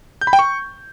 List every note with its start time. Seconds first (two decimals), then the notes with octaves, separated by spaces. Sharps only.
0.21 G6
0.27 B5
0.33 G5
0.39 C#6